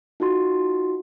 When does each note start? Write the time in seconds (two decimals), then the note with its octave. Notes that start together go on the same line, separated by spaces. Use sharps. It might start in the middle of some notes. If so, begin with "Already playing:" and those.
0.20 D#4 F4 F#4 C6